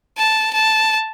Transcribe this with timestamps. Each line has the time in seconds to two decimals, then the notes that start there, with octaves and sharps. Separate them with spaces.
0.17 A5
0.53 A5